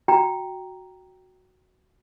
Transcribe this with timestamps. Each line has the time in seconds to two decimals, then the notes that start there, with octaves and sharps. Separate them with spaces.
0.08 F#4 G5 A#5